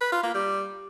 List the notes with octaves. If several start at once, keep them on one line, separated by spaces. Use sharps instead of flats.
B4
F4
A#3
G3